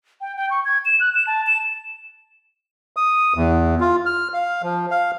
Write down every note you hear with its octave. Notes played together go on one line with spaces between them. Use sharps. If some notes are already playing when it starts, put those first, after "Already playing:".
G5
G5
C#6
G#6
E7
F#6
E7
A5
E7
D#6
E2
F4
F6
F5
F3
F5